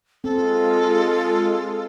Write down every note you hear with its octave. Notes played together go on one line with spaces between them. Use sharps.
G#3 C4 F4 A4